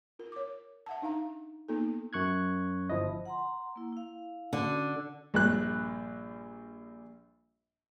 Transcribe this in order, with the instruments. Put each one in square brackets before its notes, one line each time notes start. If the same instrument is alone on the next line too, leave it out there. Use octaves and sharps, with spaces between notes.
[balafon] F4 A#4
C#5 D6
E5 F#5 A5
D4 D#4 F5 A#5
A#3 B3 D#4 F4 A4
[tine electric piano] F#2 C#6 F#6 G#6
G1 F3 E4 D#5
[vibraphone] F#5 A#5 C6
A#3 E4
E4 F5
[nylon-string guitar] D3 [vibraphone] C#4 F#4
[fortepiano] A#1 G2 F#6